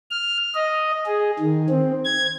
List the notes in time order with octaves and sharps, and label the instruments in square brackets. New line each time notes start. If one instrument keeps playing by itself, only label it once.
[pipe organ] F6
D#5
G#4
D#3
C4
G#6